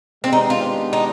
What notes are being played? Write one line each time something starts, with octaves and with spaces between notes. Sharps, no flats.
D#3 G#3 B3 C4 D4 G4
D#4
F4
D#4